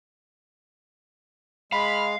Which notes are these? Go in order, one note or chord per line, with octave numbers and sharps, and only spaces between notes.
G#3 F5 B5